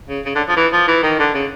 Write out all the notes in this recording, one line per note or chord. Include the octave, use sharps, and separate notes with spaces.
C#3
C#3
D3
F3
E3
F3
E3
D#3
D3
C#3